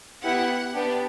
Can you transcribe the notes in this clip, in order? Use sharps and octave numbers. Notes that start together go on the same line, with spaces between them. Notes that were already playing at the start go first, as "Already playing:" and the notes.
B3 E4 G4 F#5
B3 D4 G4